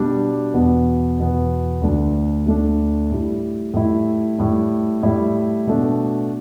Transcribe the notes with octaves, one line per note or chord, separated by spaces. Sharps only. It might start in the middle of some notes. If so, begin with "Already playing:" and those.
Already playing: B2 G3 D4
E2 B2 B3
E2 B2 B3
D2 D3 A3 D4
D2 D3 A3 D4
A2 G3 E4
A2 G3 E4
A2 G3 E4
A2 G3 E4
B2 A3 D4